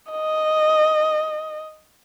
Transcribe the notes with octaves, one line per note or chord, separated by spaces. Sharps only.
D#5